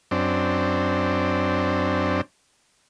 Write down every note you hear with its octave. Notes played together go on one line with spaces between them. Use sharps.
F#2 C4 D4